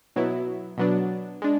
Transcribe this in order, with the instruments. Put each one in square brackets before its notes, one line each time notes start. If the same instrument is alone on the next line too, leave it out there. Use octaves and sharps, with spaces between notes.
[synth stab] B2 F#3 B3 E4
B2 F#3 B3 D4
G#3 D4